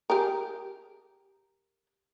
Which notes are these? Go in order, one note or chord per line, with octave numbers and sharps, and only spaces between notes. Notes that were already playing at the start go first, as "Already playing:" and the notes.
G4 G#4 A#4